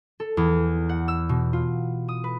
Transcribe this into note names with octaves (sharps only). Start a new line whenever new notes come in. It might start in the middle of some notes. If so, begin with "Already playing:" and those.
A4
E2
F#5
E6
B2
F4
D#6
B4